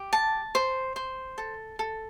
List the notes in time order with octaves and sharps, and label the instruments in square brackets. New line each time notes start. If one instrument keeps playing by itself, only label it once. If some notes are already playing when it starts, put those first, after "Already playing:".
Already playing: [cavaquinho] G4
A5
C5
C5
A4
A4